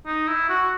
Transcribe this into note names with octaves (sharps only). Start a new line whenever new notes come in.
D#4
E4
F#4